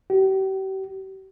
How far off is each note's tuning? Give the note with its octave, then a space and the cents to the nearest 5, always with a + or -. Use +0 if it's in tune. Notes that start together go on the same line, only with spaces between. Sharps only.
G4 -40